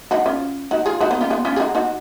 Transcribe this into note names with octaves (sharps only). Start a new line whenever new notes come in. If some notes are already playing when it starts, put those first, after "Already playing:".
D#4 F#4
C#4 F4
D#4 F#4
F4 G#4
D#4 F#4
B3 D#4
C#4 F4
B3 D#4
C#4 F4
G#4
D#4 F#4
D#4 F#4